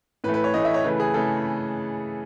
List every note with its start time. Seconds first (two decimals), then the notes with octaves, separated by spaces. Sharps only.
0.24 A2 E3 A3 B4
0.34 B4
0.44 C#5
0.54 A2 E3 A3 D#5
0.65 E5
0.74 C#5
0.84 C#3 E3 A3 B4
1.00 G#4
1.14 C#3 E3 A3 A4